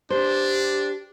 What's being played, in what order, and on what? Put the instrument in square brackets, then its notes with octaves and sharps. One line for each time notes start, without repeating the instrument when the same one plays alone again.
[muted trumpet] D4 [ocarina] G4 [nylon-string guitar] C5